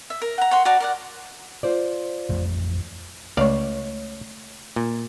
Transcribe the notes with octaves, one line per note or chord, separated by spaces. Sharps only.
E5
A#4
F#5 A#5
C#5 F#5 C6
F#4 D5 A5 A#5
A#4 D5 F#5
F4 C5 D5
A1 F2 A3
C#2 A3 C#5 D5 F5 C#6
A#2